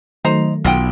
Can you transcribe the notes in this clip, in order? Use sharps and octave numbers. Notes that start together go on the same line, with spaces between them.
D#3 F#3 A3 D#4 C5 A#5
B1 F4 F#5 G5